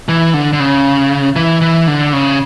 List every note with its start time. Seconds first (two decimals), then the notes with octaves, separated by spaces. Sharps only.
0.09 E3
0.34 D3
0.53 D3
0.60 C#3
1.36 E3
1.61 E3
1.88 D3
2.13 C#3